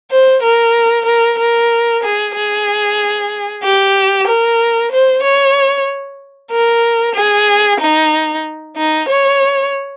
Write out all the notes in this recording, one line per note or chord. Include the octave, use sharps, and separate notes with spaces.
C5
A#4
A#4
A#4
G#4
G#4
G4
A#4
C5
C#5
A#4
G#4
D#4
D#4
C#5